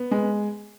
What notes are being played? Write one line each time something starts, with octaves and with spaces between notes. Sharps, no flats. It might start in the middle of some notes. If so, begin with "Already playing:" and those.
Already playing: B3
G#3